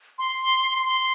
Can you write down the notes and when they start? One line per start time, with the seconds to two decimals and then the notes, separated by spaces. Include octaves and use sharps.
0.19 C6
0.83 C6